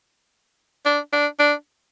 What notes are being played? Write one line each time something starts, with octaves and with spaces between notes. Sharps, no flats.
D4
D4
D4